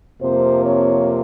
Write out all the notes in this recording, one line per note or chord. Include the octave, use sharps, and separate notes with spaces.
F2 C3 F3 A#3 C5
C#5